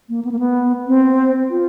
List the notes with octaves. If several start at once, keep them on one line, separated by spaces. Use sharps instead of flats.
A#3
B3
A#3
B3
C4
F4